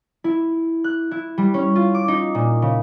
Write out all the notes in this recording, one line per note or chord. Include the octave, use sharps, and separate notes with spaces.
E4
F#6
E4
G3
C#4
F4
D6
D#4
A#2
C#3